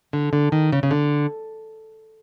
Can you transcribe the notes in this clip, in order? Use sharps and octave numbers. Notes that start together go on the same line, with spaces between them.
D3
D3
D#3
C#3
C#3
D3